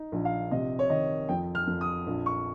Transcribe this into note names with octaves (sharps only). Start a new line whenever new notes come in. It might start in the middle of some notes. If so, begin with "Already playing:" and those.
Already playing: D#4
A#1
F5
C3 D#5
C#5
D#3 D#5
F2 G5
F6
F2
D#6
A#1
C#6